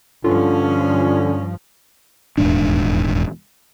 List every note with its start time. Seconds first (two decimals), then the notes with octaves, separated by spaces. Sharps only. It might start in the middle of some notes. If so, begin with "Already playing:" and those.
0.24 G2 D3 F3 C#4 F4
2.38 D#1 E2 G#2 D4